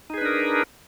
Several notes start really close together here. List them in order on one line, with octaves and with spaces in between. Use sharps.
D#4 G#4 B4 D4 A#4